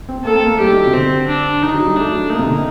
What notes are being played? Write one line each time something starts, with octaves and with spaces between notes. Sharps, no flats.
C4
A#3 A4
C4
A#3
A3
G3 G4
D#3
F#3
C3
D3 C4
D4
D#3 D#4
F#3
G3
A3 D4
F#3
A3
A#3 D#4
C3
D3
D#3